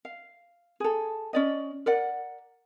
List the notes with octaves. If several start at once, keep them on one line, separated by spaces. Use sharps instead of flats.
F5
G#4 A4
C#4 D5 D#5
A#4 D5 F#5